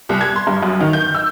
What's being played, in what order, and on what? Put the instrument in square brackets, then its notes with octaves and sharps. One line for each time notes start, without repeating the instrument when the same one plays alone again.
[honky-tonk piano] C2
G#6
C6
G2
F#2
D#3
G6
E6